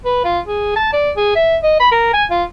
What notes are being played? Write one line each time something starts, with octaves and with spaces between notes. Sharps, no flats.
B4
F4
G#4
A5
D5
G#4
E5
D#5
B5
A#4
G#5
F4